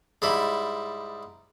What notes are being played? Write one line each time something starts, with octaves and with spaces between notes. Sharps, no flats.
G#2 G3 E4